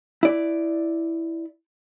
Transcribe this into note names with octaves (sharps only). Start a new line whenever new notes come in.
E4 D5